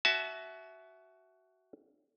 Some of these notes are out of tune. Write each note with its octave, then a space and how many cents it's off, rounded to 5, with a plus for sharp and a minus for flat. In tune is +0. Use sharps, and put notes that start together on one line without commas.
F#4 +15 E5 +0 A5 -40